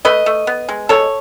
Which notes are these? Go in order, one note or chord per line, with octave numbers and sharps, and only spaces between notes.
A3 B4 D#5
A3
B3
G#3
B2 A4 C#5